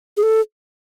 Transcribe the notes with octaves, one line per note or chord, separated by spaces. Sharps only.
G#4
A4